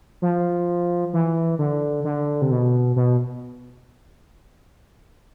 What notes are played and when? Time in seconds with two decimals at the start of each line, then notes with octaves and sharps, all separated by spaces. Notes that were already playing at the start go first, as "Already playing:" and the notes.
0.22 F3
1.13 E3
1.59 D3
2.05 D3
2.42 C3
2.51 B2
2.96 B2